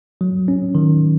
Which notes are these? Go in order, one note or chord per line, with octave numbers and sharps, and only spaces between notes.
F#3
C#4
D#3